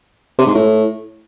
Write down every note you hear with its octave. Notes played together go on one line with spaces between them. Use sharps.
C3
G#2
A2